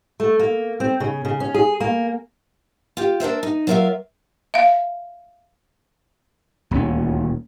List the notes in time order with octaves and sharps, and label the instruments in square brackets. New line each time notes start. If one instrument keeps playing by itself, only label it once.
[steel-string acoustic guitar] A3
A#3
C4
C#3
C#3
C#4
G#4
A#3
F4 G4
D4 A#4 C5 E5
D#4
F#3 F4 A#4 C5 E5 F5
[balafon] E5 F5
[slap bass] D#1 D2 C4 C#4